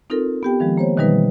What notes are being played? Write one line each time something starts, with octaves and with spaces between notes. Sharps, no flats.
C4 D#4 F4 A4 A#4
B3 G4 G5
D#3 F3 G#3
A#3 C5 C#5
B2 D#3 E3 G3 D#4 B4